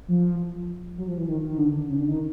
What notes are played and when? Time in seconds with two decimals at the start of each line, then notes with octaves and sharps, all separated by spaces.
0.08 F3
0.98 F#3
1.08 F3
1.18 E3
1.28 D#3
1.47 D#3
1.58 D3
1.88 C#3
1.98 D3
2.07 D#3